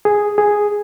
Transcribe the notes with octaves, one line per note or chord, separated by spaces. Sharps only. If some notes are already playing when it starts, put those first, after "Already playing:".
G#4
G#4